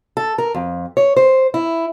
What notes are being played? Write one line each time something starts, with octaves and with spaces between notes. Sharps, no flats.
A4
A#4
F2
C#5
C5
E4